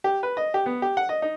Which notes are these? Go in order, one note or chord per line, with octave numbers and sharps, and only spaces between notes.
G4
B4
D#5
G4
B3
G4
F#5
D#5
D#4